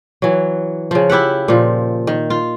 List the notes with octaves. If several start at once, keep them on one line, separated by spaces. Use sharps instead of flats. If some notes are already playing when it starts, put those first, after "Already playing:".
E3 F#3
C#3 F3
E4 G4 E5 F#5
A#2 F3
D#3
F4